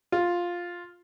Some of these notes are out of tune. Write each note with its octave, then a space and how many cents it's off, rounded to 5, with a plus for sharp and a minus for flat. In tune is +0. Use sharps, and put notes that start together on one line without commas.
F4 +5